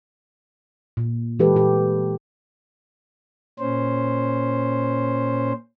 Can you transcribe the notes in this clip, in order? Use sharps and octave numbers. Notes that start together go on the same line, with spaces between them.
A#2
E3 G#3 G4 A4 B4
A#2 G4
A#2 C#4 C5